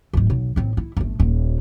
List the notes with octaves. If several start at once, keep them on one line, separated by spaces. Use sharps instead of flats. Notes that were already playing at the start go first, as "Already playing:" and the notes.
D1 G#2
B1
A1 C4
E4
G1 A3
D#1